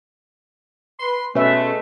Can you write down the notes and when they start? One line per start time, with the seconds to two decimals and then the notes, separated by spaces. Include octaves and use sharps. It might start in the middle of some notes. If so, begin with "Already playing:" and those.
1.00 B4 C6
1.35 B2 G#3 A3 C#4 B4 E5